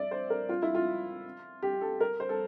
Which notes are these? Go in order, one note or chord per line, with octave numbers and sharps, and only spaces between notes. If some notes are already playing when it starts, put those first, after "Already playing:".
Already playing: D5 E5
C5
A#4
F4
E4
F4
G4
A4
A#4
C5
A4